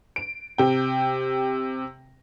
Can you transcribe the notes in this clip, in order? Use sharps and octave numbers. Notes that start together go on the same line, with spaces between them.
D7
C3 G5